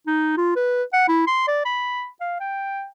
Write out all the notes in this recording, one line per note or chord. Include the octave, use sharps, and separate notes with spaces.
D#4
F4
B4
F#5
E4
C6
D5
B5
F5
G5